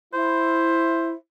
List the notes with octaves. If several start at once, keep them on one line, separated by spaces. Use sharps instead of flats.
E4 C5